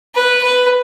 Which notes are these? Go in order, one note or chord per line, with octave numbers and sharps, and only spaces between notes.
B4
B4